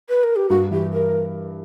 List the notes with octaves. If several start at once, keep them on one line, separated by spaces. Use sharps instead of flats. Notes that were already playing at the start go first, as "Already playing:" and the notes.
B4
A#4
G4
G2 F#4
E3 G4
A#4